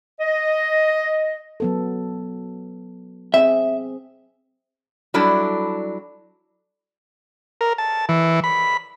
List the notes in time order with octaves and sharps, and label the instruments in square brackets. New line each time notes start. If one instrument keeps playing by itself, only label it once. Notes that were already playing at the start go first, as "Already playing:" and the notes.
[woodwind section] D#5
[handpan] F#3 B3 A4
[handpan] C4 G#4 [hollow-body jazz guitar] E5
[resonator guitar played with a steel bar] F#3 G3 D4 E4 A4
[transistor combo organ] A#4
A5
E3
B5